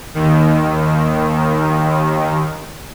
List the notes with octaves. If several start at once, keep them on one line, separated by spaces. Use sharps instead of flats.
D#2 D#3